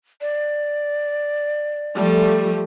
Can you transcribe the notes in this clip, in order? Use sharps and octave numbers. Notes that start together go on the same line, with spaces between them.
D5
F3 G3 A3